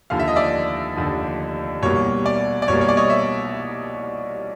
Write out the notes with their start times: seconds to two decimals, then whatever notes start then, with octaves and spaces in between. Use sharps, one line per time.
0.10 F1 D#2 D3 F3 F5
0.20 E5
0.28 D#5
0.36 D5 E5
0.96 F1 D#2 D3 F3
1.82 C2 B2 G3 A#3 C#5
2.26 D5
2.62 D5
2.68 C2 B2 G3 A#3 C#5
2.81 C#5
2.89 D5
2.97 C#5 D#5
3.10 E5